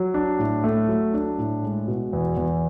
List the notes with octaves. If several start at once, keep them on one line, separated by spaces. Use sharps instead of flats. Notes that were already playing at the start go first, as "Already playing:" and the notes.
Already playing: F#3
D4
A2
A3
F#3
D4
A2
G#3
B2
E2
E2